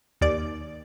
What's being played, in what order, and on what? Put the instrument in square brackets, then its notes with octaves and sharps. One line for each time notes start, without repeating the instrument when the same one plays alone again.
[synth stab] D#2 D5